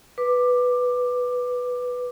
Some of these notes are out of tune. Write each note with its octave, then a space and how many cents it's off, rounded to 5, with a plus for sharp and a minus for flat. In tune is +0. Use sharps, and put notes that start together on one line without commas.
B4 +0 D6 +10